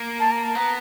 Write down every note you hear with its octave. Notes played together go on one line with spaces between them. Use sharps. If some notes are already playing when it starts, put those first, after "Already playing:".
Already playing: A#3
A5
A#5
A5
B3 A#5